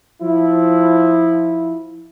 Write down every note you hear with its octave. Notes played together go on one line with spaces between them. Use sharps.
F3 E4